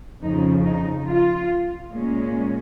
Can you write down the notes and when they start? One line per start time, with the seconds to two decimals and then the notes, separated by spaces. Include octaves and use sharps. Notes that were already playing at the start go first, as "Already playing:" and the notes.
0.22 F2 C#3 F3 D#4
0.64 D#4
1.07 F4
1.92 A#2 G#3 C#4